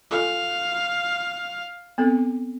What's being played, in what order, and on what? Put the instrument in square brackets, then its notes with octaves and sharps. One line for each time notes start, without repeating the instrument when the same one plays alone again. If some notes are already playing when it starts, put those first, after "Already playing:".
[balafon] F4 A4 G#5 [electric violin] F5
[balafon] B3 C4 A4